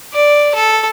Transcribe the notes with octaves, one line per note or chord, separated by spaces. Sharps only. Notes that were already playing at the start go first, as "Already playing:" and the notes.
D5
A4